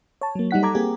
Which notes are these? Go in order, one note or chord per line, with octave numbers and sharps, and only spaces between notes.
C#5 A5
F#3 A#3
G3 D#4 F#5 B6
A4 A#5 D6 G#6
A#3 C4 G4 G#4